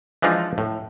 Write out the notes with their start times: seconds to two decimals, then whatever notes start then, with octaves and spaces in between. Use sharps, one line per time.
0.22 E3 F3 G#3 D4 D#4 F4
0.58 A2